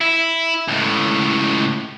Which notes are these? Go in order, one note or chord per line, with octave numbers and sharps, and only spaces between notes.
E4
C#2 A2